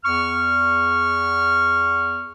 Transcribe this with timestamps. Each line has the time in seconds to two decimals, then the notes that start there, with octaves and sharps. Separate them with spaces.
0.04 E2 C#6 F6